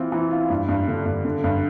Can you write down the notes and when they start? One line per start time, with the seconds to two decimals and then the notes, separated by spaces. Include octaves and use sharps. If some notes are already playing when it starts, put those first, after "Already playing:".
Already playing: E3 C4 F4
0.12 E3
0.31 F4
0.50 G2
0.69 G2
0.88 D3
1.06 G2
1.25 D3
1.44 G2